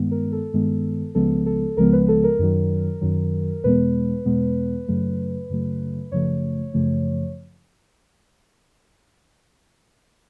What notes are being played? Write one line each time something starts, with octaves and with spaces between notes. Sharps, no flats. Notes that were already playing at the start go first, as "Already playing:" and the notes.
Already playing: G2 D#3 G#3 B3
A#4
A4
G2 D#3 G#3 B3
C#2 C#3 F3 G#3 B3 A4
A4
C#2 C#3 F3 G#3 B3 A#4
B4
A4
A#4
F#2 D#3 F#3
F#2 D#3 F#3
E2 B2 G#3 B3 B4
E2 B2 G#3 B3
F#2 C#3 F#3 A3
F#2 C#3 F#3 A3
F#2 C#3 F3 A3 C#5
F#2 C#3 F3 A3